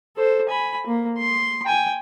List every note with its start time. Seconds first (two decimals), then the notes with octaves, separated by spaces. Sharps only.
0.16 A4 C5
0.49 G#5 B5
0.87 A#3
1.18 C6
1.65 G5 G#5